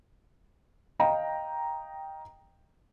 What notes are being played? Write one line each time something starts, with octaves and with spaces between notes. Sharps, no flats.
D#5 F5 G5 A#5